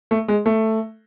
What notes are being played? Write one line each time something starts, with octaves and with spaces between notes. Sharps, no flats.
A3
G#3
A3